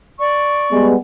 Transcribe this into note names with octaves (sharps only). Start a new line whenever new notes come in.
D5 C#6
G3 G#3 B3